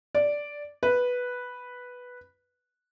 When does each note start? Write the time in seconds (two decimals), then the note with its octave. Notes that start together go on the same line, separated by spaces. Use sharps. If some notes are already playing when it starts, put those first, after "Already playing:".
0.15 D5
0.83 B4